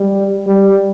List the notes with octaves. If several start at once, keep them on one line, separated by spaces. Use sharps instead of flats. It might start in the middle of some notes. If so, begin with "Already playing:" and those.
Already playing: G3
G3